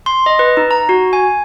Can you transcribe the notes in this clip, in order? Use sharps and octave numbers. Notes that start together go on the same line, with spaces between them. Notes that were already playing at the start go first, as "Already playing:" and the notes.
C6
D#5
B4
D#4
A#5
F#4
G#5